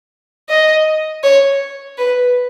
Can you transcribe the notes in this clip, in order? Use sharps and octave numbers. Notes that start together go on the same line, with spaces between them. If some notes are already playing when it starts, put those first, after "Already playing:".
D#5
C#5
B4